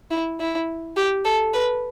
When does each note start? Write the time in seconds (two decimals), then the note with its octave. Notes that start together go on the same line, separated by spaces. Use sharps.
0.11 E4
0.40 E4
0.97 G4
1.25 A4
1.53 B4